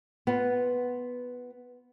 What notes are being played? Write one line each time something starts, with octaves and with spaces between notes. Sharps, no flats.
B3 F4 B4